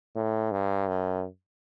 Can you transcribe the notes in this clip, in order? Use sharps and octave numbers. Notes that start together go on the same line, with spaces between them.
A2
G2
F#2